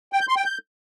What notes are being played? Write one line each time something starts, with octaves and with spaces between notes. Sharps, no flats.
G5
G6
C6
G5
G6